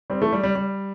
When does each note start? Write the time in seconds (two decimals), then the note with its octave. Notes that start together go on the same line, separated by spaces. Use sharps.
0.10 G3 C4
0.22 E3 A3
0.32 G3
0.43 G3
0.55 G3